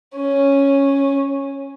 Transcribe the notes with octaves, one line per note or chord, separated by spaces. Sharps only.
C#4